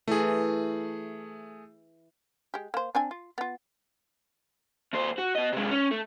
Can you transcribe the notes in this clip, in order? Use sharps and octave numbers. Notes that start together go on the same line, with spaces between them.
E3 A3 G#4
G#3 G4
A#3 C5
C4 D4 G#5
F4
B3 F4
D#2 C5
F#4
B3 D#5
C3 G#3
C#4
A3